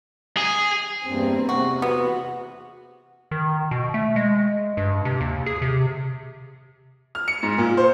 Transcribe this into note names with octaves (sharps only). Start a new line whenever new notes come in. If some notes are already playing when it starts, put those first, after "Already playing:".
G#4
E2 G2 A#3 C4
E2 C3 F#4
B3 F#4
D#3
B2
A3
G#3
G2
C3
D#2
G#4
C3
F6
C#7
G#2
A#2
C5